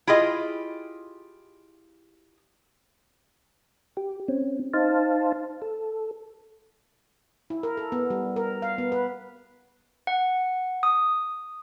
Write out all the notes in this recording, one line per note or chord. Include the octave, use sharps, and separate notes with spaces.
E4 F4 G4 G#4 D#5
G4
C4 C#4
D#4 C5 F5 A5
A4
E4
A#4
A4
B3
G3
A#4
F5
B3
B4
F#5
D#6